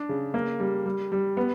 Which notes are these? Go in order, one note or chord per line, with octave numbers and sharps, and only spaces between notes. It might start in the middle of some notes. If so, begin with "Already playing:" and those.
Already playing: D4
C#3
A#3
G3
G3
G3
B3